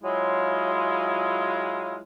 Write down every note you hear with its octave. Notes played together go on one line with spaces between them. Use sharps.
F#3 G#3 E4 F4